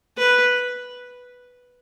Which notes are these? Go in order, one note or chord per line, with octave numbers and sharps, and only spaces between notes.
B4